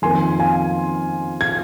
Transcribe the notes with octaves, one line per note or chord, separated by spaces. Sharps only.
F2 D#3 A#3 G#5 C6
F5 G#5
G#6